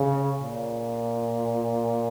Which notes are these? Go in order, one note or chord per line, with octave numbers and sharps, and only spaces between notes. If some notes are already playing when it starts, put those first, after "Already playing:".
Already playing: C#3
A#2